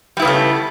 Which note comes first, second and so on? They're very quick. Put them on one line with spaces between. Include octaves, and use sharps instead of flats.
G3 E4 B3 C#3 A3